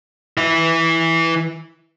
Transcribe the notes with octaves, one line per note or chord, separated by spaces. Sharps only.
E3 E4